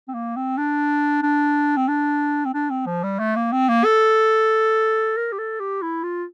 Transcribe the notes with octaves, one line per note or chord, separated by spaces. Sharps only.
C4
A#3
C4
D4
D4
C4
D4
C4
D4
C4
F3
G3
A3
A#3
C4
A#3
A4
A#4
G4
A4
G4
E4
F4